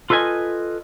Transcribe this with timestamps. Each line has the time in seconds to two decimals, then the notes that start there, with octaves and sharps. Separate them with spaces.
0.10 F4 A4 B4 D#5 G#5